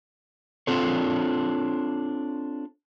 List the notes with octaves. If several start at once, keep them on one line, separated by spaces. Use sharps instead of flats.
C4 D4 F4 A4 C#5